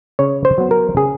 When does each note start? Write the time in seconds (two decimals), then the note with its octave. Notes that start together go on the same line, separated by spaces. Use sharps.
0.19 C#3 C#5
0.45 C5
0.58 F#3 B3
0.71 A#4
0.97 C#3 G#4